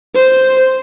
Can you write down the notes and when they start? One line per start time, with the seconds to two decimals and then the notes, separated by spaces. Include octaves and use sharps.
0.16 C5